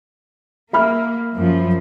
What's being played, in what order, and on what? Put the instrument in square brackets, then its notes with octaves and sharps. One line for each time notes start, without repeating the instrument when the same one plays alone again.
[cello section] A#3 [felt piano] E5 B5 F6
[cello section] F#2 F3